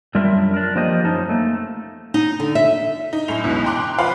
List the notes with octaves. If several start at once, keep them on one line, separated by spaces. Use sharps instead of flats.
F#2 G3 D4 F4 A#4 E5
D4 A#4
F3 A#3 F4 G4 C5 D#5
F#2 C#4 D#4 C5 A5
A3 A#3
D#4
D3
E5
D#4
F#2 A2 F7
C#2 B2 E3
G5 A#5 C6 D6 F#6
F3 B4 C5 F5 F#5 B5